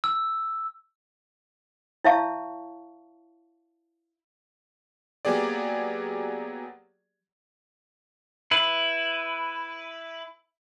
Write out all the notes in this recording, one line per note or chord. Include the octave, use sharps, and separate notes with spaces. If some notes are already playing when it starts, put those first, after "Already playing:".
E6
E4 C#5 E5 F5 A5 C#6
F#3 A#3 B3 G4 G#4 D5
E4 B4